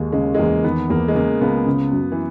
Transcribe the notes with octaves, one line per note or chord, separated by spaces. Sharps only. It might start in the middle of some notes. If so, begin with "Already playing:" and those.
Already playing: D#2 G#3
C#3 G#3
G#3
E2 A#3
D#3 B3
E2 A#3
G#3
C#3 A#3
C#2 B3
C#3
F#2
E3